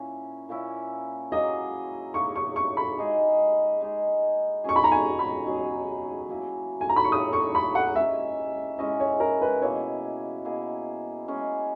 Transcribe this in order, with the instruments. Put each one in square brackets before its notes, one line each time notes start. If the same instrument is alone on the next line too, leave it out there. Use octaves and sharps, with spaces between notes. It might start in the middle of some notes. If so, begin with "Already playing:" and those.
Already playing: [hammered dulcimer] A#2 A#3 C#4 E4
A#2 A#3 C#4 E4
[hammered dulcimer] F#3 A#3 E4 G#4 [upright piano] D#5
[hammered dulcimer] F#3 A#3 E4 G#4 [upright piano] C#6
[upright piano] C#6
C#6
B5
[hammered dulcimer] G#3 D#4 G#4
G#3 D#4 G#4
[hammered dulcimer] B2 F#3 C#4 G#4 [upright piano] C#6
[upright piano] B5
A#5
G#5
B5
[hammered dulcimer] B2 F#3 C#4 G#4
F#3 A#3 E4
[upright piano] G#5
A#5
B5
C#6
[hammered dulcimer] F#3 A#3 E4 [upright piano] D#6
[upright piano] C#6
B5
F#5
[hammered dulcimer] G#3 C#4 E4 [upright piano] E5
[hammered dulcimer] G#3 C#4 E4 [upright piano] D#5
[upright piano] C#5
A#4
B4
[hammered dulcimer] B2 A#3 E4 G#4 [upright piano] C#5
[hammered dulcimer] B2 A#3 E4 G#4
G#3 C#4 G#4